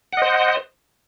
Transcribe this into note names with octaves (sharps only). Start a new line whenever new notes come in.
C5 D#5 F#5